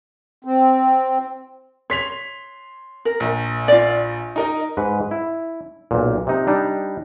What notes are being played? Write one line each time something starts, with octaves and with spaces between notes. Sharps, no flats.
C4
C#5 C6 B6 F7
A#4
A#1
F4 D5
D#4 A#4 D#5
G#2 B4
E4
B1 A#2
C3 D#4
G3 D4 D#4